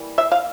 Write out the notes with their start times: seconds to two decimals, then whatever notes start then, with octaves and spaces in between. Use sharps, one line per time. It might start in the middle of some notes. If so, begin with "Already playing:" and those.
Already playing: E3 G3 A#3
0.18 E5
0.32 F5